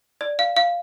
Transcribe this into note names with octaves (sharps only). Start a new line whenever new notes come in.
D5
F5
F5